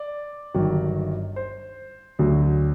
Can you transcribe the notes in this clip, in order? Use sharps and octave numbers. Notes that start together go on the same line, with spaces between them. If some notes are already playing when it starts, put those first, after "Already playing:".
Already playing: D5
G1 G2 D#3 F#3
C5
D2 D3 F#3